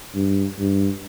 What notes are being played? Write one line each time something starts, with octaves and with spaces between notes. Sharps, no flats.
G2
G2